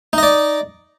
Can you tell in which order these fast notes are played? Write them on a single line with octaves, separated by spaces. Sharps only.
D#4 D#5 D5